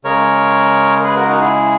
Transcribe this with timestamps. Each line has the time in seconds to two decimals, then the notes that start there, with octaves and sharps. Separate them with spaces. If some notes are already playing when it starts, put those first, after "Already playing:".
0.04 C#3 G#3 A#4 C#5
1.04 G#4 B4
1.16 F#4 A#4
1.29 D#4 F#4
1.41 E4 G#4